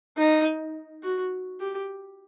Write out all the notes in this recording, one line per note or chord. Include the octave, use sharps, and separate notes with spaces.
D#4
F#4
G4